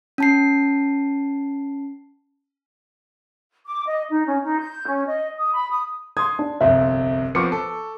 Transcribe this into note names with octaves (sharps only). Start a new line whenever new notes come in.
C#4 A5 C7
D6
D#5
D#4
C#4
D#4
G6
C#4
D#5
D#6
B5
D#6
C6 D#6 G#6
D4
G1 C2 F2 E5
F3 B3 C4 C#6 D6 C#7
A4